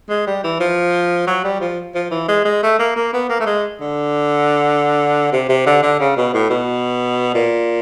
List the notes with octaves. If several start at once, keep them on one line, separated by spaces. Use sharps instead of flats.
G#3
G3
E3
F3
F#3
G3
F3
F3
E3
G#3
G#3
A3
A#3
A#3
B3
A#3
A3
G#3
D3
C3
C3
D3
D3
C#3
B2
A2
B2
A#2